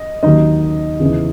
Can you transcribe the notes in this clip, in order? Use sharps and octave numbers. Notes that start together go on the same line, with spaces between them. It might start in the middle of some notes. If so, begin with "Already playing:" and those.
Already playing: D#5
D#2 D#3 F#3 D#4 D#5
E2 C#3 E3